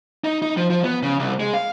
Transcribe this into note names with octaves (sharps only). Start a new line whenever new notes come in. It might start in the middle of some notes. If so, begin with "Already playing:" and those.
D#4
D#4
F3
F3
B3
C#3
C2
G#3
F5